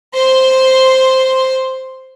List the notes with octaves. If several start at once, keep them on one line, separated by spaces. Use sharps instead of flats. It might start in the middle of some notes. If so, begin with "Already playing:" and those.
C5 C6